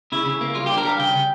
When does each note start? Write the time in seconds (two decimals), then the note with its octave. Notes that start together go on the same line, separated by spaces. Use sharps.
0.12 C#3 E4
0.26 C#3
0.41 A#3
0.55 G3 F4
0.66 D4 G4
0.77 A#4
0.84 G3 F5
0.99 C#3 G5